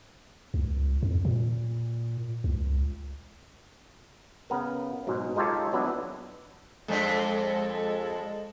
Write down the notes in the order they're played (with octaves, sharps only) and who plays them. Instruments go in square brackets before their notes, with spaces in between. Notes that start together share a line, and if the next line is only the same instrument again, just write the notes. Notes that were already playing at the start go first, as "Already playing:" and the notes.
[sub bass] C#2
F2
A#2
C#2
[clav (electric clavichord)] C#3 B3 A#4
G#2 B2 F#3 G#3
G#3 D#4 F4 G4 A4 C#5
E3 F#3 B3 D4 E4
[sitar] F2 D4 [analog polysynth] G#3 A4